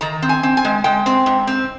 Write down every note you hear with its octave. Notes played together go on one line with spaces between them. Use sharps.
D#3 A#5
C4
G#5
C4
G#5
G#3
G#3 G5
C4
G#2
C4